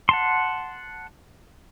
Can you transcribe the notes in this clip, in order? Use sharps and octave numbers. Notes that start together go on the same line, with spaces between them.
F#5 A5 C6